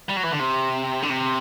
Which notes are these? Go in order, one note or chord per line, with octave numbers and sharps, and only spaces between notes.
G3
F#3
E3
D3
C3
D3
C3